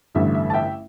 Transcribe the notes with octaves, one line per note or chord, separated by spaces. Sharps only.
A1 G2 D3 A3 E5
E5
A5
E5 G5